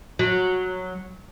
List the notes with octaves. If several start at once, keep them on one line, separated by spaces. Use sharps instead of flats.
F#3